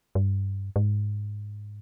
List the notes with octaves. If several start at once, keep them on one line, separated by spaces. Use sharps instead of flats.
G2
G#2